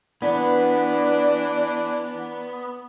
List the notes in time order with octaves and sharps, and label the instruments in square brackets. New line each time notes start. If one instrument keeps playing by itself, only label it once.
[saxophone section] E3 D4 [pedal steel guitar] B3